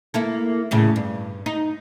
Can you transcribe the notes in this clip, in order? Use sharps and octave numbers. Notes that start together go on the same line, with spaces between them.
A#3 E4 A4
E2 A2 C#3
G2
D#4